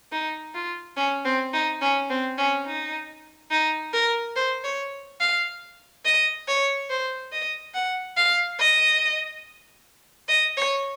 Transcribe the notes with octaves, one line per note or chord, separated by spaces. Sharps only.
D#4
F4
C#4
C4
D#4
C#4
C4
C#4
D#4
D#4
A#4
C5
C#5
F5
D#5
C#5
C5
D#5
F#5
F5
D#5
D#5
C#5